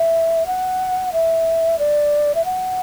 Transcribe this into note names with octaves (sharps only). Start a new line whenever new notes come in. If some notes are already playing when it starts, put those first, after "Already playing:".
Already playing: E5
F#5
E5
D5
E5
F#5